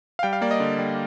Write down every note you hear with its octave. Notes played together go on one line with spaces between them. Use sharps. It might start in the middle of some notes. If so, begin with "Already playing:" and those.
F5
G3 G5
F5
A#3 D5
D#5
D3
G3